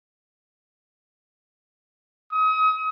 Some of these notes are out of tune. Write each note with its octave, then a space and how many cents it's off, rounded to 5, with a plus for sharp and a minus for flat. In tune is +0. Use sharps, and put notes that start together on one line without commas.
D#6 +35